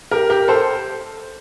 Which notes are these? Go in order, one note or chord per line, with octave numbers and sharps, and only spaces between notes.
G4 A#4
G4 A#4
A4 C5